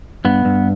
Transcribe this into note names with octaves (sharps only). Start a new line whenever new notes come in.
G2 B3
G2